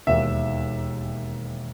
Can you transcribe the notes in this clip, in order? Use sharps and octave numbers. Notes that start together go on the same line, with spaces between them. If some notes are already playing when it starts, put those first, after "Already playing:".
E1 D#2 D#3 E5